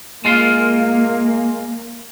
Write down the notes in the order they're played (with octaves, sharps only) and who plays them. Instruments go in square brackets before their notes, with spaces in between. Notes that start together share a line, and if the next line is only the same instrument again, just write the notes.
[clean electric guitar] G#3 F4 F5 [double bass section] A#3